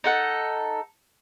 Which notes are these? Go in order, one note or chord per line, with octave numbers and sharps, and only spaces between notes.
D#4 A4 F#5